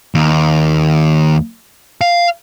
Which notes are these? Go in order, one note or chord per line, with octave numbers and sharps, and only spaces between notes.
D#2
F5